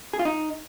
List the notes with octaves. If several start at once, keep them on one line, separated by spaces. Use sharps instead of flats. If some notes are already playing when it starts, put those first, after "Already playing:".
G#4
F4
D#4